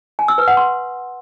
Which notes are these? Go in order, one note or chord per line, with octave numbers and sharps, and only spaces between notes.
G#5
E6
B4
F#5
C6